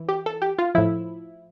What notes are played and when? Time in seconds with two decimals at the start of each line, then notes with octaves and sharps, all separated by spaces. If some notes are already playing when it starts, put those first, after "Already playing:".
Already playing: E3
0.09 G4
0.26 A4
0.42 G4
0.58 F4
0.75 A2 F3 E4